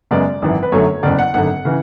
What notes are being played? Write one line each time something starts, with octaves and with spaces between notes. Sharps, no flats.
F#2 C#3 G#3 B3 D5
G#1 F#2 E3
B4
F#2 D3 F#3 A3 C#5
F#1 E2 C#3 D5
F#5
G#1 F#2 D3 F#5
C#3 E3